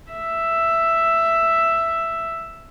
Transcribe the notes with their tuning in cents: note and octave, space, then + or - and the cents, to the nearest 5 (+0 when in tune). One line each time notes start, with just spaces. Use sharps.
E5 +5